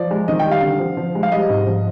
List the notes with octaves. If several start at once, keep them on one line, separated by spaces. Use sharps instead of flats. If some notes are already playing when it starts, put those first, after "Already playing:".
Already playing: F3 D5
G#3
D#3 D#5
G5
G3
F5
D3
F3
F3
G#3
F5
G3 D#5
G#2
F3